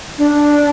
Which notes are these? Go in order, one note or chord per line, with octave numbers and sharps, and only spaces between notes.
D4